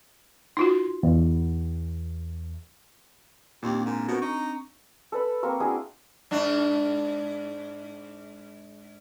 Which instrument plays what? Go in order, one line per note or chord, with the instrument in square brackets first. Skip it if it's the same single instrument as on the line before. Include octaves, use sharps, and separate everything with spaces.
[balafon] D#4 F4 F#4 [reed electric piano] C6
[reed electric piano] E2
[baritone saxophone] D#2 [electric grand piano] A#2 [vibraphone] C4 D4 [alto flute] G4
[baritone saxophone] G#2 [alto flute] A#4
[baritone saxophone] B2 [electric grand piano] F#4 A#4 [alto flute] C5
[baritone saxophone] D#4 [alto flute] A#5 [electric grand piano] C#6
[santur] A4 B4 B5
A#3 C4 A#4 C#6
D4 E4 F#4 G#4
[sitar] G#2 D4